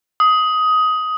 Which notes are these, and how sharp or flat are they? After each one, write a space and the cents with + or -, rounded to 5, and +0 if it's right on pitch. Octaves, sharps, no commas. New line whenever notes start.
D#6 +15